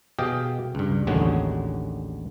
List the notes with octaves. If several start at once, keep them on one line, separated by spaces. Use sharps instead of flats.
B2 G4 G#4 D#5 F5 G5
C#2 G2
A1 D#2 D3 G#3 F#4 C#5